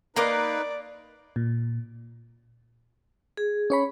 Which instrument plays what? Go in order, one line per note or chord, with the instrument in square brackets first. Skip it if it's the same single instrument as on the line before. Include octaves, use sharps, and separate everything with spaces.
[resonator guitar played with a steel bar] A#3 [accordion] D#4 B4 [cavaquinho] A#4 C6 D6 [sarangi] D5
[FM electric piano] A#2
[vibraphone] G#4
[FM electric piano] C#4 C#5 B5